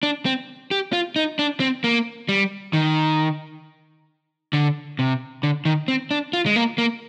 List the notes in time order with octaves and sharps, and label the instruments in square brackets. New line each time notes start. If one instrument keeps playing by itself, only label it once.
[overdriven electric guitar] D4
C4
G4
F4
D#4
D4
C4
A#3
G3
D#3
D3
C3
D3
D#3
C4
D4
F4
G#3
A#3
A#3